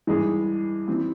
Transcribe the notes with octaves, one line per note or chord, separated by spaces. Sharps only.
G2 E3 G#3 E4 G#4
E3 G3 C4